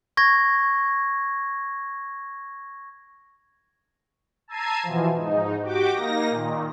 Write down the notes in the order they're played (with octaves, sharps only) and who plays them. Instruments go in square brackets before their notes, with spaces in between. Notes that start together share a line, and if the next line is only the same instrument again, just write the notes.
[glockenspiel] C#6 G#6 A#6
[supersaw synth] A5 A#5 E6 G#6 C7 D#7
B2 E3 F3
G#2 D#4
F#4 G4 G5 D6
A#3 D#4 A#6
A#2 D#3